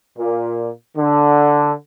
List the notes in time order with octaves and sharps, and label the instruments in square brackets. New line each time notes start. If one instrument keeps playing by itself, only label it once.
[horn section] A#2
D3